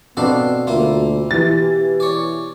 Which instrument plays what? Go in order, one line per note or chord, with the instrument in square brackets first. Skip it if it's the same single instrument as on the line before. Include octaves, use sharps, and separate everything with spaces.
[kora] B2 D4 [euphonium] B3 [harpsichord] C4 A4 F5
[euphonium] D2 [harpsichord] A#3 E4 F4
[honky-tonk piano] E3 A6 [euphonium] G4
[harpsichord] C#5 D5